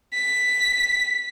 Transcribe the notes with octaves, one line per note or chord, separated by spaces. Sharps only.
B6